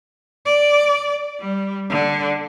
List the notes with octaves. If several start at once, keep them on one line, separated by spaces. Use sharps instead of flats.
D5
G3
D3